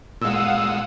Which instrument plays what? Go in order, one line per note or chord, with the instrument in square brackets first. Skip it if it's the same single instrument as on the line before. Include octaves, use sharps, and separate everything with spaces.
[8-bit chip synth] A#2 G#3 [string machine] F5 F#5 D#6 [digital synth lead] E6